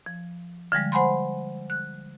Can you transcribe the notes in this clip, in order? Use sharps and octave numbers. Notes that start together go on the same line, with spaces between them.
F3
D3 F3 G3 G#3
C5 F#5 G#5 B5 C6
F#6